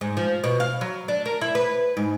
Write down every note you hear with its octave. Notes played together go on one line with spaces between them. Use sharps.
G#2
F3
B2
F5
F#3
D4
A#4
E4
B4
G#2